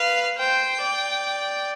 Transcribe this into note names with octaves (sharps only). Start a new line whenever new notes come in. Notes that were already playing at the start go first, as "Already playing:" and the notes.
Already playing: B4 F5
C5 G5
D5